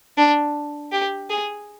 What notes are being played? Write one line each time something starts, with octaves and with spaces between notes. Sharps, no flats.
D4
G4
G#4